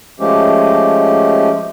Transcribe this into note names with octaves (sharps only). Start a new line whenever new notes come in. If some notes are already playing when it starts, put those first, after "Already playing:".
F3 G#3 A3 C#4 G4